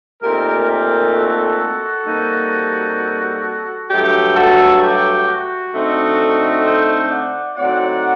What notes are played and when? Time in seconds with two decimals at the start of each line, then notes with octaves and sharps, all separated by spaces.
0.22 A#2 A3 C4 D#4 G4 A#4
0.68 G4 A#4
1.13 F#4 A4
2.06 C3 G3 A#3 D#4
3.89 G2 F#3 A3 G4
4.35 F#4 A4
4.82 G4
5.28 F#4
5.73 D3 A3 C4 D#4
6.65 C5 D#5
7.11 D5 F#5
7.57 A2 F#3 C4 D#4 D5 F#5